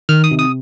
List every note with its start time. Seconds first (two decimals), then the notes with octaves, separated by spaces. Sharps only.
0.09 D#3 F6
0.24 D#6
0.31 C3
0.39 D#6